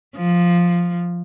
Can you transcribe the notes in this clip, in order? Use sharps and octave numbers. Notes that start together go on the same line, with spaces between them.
F3